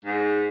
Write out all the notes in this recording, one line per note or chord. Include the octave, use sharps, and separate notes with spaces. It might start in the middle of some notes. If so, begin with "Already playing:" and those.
G#2